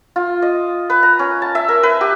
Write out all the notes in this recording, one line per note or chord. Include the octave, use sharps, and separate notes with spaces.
F4
D#5
B4
A#5
C#4
A5
E5
A#4
B4
G4